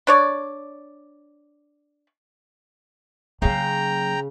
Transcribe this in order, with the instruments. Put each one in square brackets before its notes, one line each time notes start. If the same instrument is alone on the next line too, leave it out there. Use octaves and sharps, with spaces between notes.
[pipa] D4 C#5 D5
[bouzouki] C#3 [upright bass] F#3 A#3 [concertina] G5 A#5